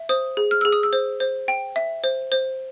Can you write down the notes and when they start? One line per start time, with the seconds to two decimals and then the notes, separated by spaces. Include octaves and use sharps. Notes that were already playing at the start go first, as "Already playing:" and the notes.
Already playing: E5
0.09 C5 D#6
0.37 G#4
0.51 F6
0.61 G#4 E6
0.73 D#6
0.83 E6
0.93 C5
1.20 C5
1.48 G5
1.76 E5
2.04 C5
2.32 C5